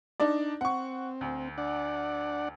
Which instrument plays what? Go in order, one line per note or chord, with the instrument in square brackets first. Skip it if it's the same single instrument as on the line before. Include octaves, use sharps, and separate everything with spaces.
[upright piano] D4 D#4 D5
[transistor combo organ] C4 [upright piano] F#5 C#6
[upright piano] D2
[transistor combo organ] D4 D5 F#5